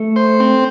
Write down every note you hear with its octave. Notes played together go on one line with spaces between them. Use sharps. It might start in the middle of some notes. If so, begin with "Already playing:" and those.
Already playing: A3
C5
C4